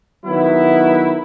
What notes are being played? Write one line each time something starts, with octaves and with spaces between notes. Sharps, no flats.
D#3 F#3 B3 E4